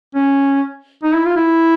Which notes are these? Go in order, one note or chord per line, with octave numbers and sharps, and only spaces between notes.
C#4
D#4
E4
F4
E4